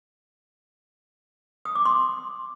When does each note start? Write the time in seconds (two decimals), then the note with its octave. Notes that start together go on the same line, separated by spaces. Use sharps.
1.65 D#6
1.75 D6
1.85 C6